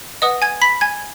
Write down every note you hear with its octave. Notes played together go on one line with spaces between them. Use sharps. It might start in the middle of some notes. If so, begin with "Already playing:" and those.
B4 D#5 F#5 D#6
G#5 G#6
B5 B6
G#5 G#6